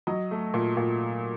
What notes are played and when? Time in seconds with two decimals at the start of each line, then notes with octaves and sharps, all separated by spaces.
0.07 F#3 D#5
0.31 A3
0.54 A#2
0.77 A#2